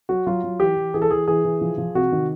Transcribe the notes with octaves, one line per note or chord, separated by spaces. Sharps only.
F#3 F#4
F#3 F4
F#3
E3 G4
E3
E3 G#4
A4
E3 G#4
E3 G#4
E3
F3
F3
C3 F#4
D#3